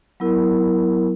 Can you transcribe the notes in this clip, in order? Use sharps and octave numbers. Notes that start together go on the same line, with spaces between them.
F#3 B3 E4 A#4